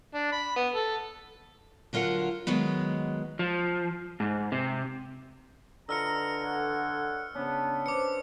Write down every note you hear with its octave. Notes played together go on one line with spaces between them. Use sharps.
D4
B5
B3
A4
D3 F#3 F4 A#4 F#5
D#3 F#3 G#3 B3
F3
G#2
C3
D3 F4 B4 D#5 A#5 E6 F6 C#7
A4 C#5 F#5
C#3 B3 C#4 D4
B4 C5 A5 D6 C#7